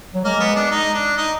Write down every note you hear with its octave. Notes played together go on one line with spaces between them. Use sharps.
F#3
G#3 A#3
B3
D4
D#4
D4
D#4